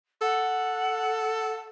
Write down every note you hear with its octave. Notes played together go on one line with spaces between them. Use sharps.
A4 F#5